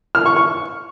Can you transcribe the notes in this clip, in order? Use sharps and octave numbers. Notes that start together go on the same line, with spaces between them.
F6
C#6
C#6